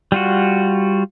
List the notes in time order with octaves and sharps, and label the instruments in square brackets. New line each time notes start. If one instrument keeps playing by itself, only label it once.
[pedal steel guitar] G3 F4 F#4